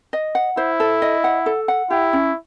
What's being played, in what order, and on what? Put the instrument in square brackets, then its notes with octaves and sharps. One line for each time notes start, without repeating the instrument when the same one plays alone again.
[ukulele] D#5
F#5
[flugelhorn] E4 [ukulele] C5
[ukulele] A4
D#5
F#5
A4
F#5
[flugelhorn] E4 [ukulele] G4
[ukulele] C#4